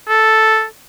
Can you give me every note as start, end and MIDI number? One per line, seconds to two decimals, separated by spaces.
0.08 0.64 69